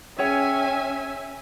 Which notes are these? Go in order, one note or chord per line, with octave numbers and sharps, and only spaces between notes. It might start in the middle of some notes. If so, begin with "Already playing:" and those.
C#4 G#4 C#5 E5 G5 G#5